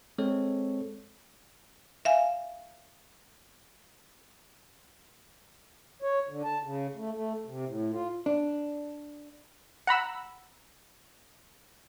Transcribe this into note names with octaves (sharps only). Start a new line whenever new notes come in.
G#3 C4 A4 C#5
E5 F5 G#5
C#5
D3
A5
C#3
A3
A3
C3
A2
F4
D4
F#5 A#5 B5 E6